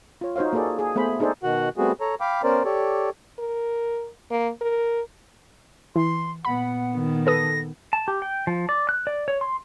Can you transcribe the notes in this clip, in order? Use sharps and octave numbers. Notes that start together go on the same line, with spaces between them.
F4 C#5
D#4 F#4 C5 C#5 F5
A#3 F#4 G#4 A4 D5
G#4
A3 B3 G#4 C5 B5
D4 D#4 G#4 A4 C5 D5
B2 D#3 F#4 F#5
G3 A3 B3 C4 F#4 G#4
A4 C#5 A#5
F5 G5 B5 D6
B3 C#4 A#4 C5 D5
G4 A4 C#5 D5
A#4
A#3
A#4
E3 C6
A#2 B3 F#5 B5
D#3
A4 B4 D#6 A#6
A5
G4
G5
F3
D5
F#6
D5
C#5
C6